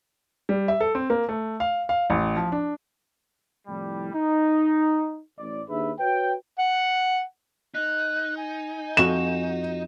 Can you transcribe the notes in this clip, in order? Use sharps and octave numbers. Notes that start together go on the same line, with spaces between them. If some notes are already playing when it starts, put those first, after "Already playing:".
G3
E5
A4
C4
A#3
A3
F5
F5
A1
F3
D4
C2 A2 F3 G3
D#4
A1 D5
D#2 D4 G#4 B4 E5
F#4 B4 C#5 G5
F#5
D#4 F#6
G#5
F2 F#4 E7